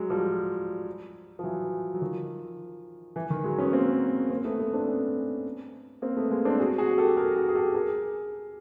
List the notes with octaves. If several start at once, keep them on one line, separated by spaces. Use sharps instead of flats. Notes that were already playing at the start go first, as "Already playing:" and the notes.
Already playing: F#3 G#3
F3 G3
F3
E3 F#3
F#3
D#3 F3
E3
D#3
F#3 G#3
B3 C#4
A#3 C4
A#3 C4
A3 B3
A3 B3
C4 D4
B3 C#4
A#3 C4
A3 B3
G#3 A#3
C4 D4
F#4 G#4
F#4 G#4
G4 A4
G#4 A#4
F#4 G#4
G#4
G4 A4
G#4 A#4